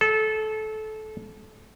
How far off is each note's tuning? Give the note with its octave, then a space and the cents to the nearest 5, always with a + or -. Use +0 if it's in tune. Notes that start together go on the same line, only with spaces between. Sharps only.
A4 -20